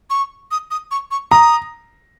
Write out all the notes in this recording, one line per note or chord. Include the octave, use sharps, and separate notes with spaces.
C#6
D#6
D#6
C#6
C#6
A#5 D#6